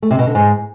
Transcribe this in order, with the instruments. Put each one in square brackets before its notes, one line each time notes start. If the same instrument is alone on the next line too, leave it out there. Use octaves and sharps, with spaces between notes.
[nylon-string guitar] A3
C3
B2
D3
G#2